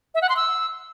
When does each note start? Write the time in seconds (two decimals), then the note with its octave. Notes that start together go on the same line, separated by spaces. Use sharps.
0.14 E5
0.22 F#5
0.29 C6
0.36 E6